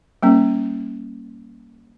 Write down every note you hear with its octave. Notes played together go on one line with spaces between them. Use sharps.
G3 A#3 C#4